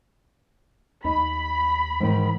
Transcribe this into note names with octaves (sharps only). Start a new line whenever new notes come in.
D#2 D#4 B5
G#2 D#3 E3